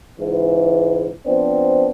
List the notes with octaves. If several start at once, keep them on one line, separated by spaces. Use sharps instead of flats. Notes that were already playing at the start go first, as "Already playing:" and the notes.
C#2 G#2 E3
F3 B3 C4 D4